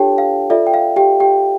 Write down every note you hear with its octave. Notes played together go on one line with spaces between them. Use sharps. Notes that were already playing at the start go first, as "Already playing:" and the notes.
Already playing: D4 F4 G4 A4 C#5 G5 A5
F5
F4 A4 D5 E5
G5
F5
G4 G5
G4 G5